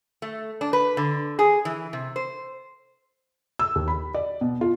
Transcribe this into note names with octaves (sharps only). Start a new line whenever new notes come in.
A3
D4
B4
D3
G#4
E3
C3
C5
E6
D#2
B5
D5
B2
F4